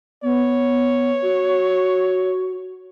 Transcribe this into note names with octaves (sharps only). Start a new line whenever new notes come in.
B3 C#5
F#4